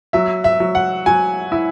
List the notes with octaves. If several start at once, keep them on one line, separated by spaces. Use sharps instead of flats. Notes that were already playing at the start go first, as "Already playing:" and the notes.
F#3 E5
E5
F#3
F#5
F#3 G#5
E4